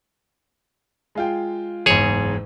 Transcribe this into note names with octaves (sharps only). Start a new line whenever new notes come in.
G#3 F4 G5
F#1 E2 G#2 G#4 C#5